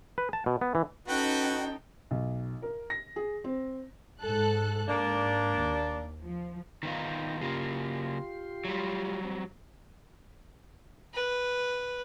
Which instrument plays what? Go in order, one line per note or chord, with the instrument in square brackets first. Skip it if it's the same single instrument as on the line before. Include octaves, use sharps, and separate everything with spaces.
[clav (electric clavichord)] B4
A5
B2
B3
E3
[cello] C#4 [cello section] D#4 [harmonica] F#4 B4 [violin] A4 G5
[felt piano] B1
A#4
A#6
G#4
C4
[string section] G#2 A4 F#6
[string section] G#2 [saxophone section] A#3 D4
[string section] D#2
F3
[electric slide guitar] D#3 B3 F4 [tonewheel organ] D#4 G5 A#5
[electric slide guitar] C#3 A#3 [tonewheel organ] F4 G4 C6
[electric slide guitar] F#3 G3
[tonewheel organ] C4
[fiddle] B4